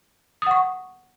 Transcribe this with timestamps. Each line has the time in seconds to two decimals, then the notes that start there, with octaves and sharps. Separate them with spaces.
0.42 D#6
0.47 F#5
0.51 C#6